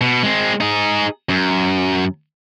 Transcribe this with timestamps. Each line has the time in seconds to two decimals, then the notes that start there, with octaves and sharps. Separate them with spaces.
0.01 B2
0.23 G#3 C4
0.61 D#4 G#4
1.29 F#2